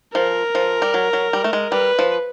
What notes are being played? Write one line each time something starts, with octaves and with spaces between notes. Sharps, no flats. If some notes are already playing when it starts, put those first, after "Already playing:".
F3 A#4
F3
G3
F#3
F#3
G3
A3
G#3
G3 B4
F3